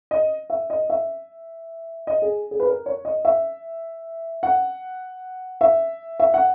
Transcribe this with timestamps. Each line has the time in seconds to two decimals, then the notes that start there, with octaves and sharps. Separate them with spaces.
0.11 D#5
0.50 E5
0.70 D#5
0.90 E5
2.07 D#5
2.22 G#4
2.51 G#4
2.60 B4
2.67 A#4
2.86 C#5
3.05 D#5
3.25 E5
4.43 F#5
5.61 E5
6.20 E5
6.34 F#5